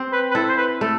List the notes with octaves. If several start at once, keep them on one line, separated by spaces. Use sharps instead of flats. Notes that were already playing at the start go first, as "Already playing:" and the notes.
Already playing: C4
B4
B4
E4 A4
C5
B4
A3 A4